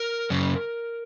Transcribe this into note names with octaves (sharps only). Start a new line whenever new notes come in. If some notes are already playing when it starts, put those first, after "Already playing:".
Already playing: A#4
F#2 C#3